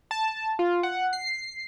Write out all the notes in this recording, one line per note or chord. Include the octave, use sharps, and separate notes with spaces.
A5
F4
F#5
C7